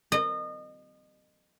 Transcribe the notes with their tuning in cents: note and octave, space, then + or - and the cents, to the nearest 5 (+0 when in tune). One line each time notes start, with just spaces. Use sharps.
D#5 -30